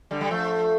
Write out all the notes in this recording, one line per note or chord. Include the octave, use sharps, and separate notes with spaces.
D3 G3
G3
F3 A3